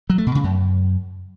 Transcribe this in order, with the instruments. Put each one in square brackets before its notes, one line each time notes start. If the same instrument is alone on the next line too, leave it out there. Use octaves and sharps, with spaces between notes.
[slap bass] F#3
A3
B2
C#3
F#2